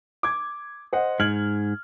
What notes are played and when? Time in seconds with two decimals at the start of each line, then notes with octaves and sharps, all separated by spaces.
0.23 D6 G#6
0.93 C5 D#5 F#5
1.20 G#2 F6 G#6 F#7